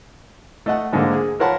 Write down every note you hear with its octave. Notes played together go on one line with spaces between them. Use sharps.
A3 D#5 F#5
G#2 D3 G#3 A#3
G#4
F4 A#4 C#5 F#5 A5 B5